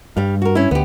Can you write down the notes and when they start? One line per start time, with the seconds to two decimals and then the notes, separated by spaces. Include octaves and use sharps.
0.17 G2 G3 F5
0.42 F#4 A#4
0.55 C#4 E4
0.71 D2 B3 G4